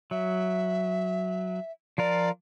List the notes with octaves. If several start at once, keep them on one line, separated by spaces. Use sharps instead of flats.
F#3 E5
F3 F4 A#4 D5